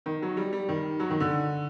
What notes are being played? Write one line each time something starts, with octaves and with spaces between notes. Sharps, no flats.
D#3
F#3
G3
G3
D#3
F#3
D#3
D3